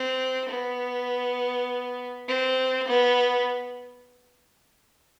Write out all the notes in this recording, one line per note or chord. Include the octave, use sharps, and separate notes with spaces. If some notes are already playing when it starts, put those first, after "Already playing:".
Already playing: C4
B3
C4
B3